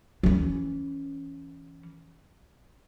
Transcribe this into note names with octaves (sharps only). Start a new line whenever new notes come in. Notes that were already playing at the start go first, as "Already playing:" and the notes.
E3 C#4